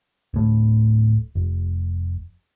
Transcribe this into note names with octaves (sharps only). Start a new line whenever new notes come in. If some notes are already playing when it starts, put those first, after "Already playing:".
D1 A2
F1